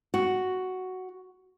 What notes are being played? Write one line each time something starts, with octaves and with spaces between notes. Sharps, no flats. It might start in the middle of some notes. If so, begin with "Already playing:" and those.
F#4